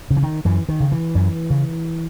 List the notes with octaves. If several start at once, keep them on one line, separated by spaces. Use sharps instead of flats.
C#3
E3
D#3
F#2 E3
D#3
C#3
E3
F#2
C#3